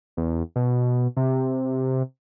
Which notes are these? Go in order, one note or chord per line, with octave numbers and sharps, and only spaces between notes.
E2
B2
C3